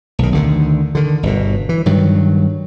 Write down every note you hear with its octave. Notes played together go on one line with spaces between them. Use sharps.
B1 D#3
D2 D3 D#3
D3 D#3
G1 B2
E3
G2 D#3 F#3